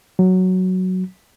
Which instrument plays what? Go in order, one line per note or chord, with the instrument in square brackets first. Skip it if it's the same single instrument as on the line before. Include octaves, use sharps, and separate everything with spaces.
[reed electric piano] F#3